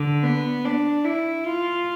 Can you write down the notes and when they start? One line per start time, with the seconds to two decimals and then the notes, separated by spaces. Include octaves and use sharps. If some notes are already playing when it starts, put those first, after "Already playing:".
Already playing: D3
0.23 B3
0.65 D4
1.05 E4
1.46 F4